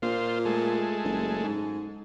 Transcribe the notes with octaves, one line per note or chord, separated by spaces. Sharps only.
A#2 F4 C5
G#3 A3
F#1
G#2